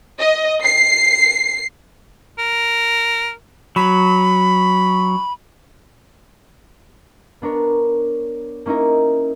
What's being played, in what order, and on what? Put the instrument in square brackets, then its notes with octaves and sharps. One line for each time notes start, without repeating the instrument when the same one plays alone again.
[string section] D#5
C7
[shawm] A#4
[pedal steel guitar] F#3 [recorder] B5
[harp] B3 D4 A#4 C#5
A#3 C#4 D#4 E4 A#4